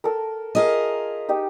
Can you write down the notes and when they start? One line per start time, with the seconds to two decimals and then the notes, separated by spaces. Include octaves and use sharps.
0.04 A4 A#4
0.55 F4 G#4 A#4 D#5 E5
1.29 D#4 G4 D#5